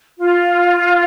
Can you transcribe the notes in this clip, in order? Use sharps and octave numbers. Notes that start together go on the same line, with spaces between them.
F4